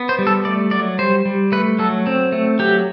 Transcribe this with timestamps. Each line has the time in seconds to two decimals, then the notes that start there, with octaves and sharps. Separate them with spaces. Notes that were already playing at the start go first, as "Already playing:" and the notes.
Already playing: B3
0.09 C5
0.19 G3
0.27 A4
0.45 A3 D5
0.71 F#3 D5
0.99 G3 C5
1.25 G3
1.52 A3 B4
1.79 F#3 A4
2.07 C4
2.32 A3
2.59 F#3 G4